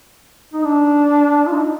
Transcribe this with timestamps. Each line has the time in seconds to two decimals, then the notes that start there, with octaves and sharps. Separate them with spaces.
0.54 D#4
0.64 D4
1.47 F4
1.53 D#4